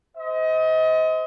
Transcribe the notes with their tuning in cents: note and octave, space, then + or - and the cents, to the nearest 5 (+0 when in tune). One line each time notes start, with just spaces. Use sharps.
C5 -25 D#5 +30